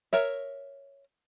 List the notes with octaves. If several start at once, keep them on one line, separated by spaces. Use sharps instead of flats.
A#4 C#5 E5